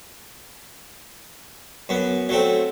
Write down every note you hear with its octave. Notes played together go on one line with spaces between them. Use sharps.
F#2 B3
F#3 A3 C4